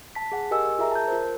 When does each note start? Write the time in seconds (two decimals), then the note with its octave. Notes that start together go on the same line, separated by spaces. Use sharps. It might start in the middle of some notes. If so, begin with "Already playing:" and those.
0.15 A5 B6
0.32 G#4 F#5
0.51 G4 A#4 D#5 G#5 E6
0.79 F4 G#4 A#4 E5 A#5
0.92 A5 G6
1.08 F4 A#4 C5